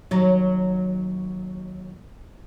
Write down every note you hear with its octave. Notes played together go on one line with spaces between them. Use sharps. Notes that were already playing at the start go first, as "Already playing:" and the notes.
D#2 F#3